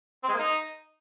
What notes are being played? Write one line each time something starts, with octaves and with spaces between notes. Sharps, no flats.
C4
G#3
A#3
D#4